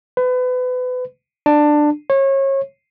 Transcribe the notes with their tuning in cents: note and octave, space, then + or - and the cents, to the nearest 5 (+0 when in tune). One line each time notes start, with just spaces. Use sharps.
B4 +30
D4 +15
C#5 -30